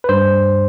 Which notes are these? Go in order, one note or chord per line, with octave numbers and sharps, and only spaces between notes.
B4
G2 C5